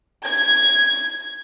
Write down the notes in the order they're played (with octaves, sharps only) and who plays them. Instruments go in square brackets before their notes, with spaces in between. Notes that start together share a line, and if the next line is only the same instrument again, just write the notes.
[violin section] G#6